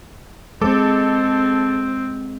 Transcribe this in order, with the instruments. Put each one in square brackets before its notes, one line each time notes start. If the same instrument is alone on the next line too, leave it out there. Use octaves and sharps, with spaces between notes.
[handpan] G#3 [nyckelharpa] C4 [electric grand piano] A4 D6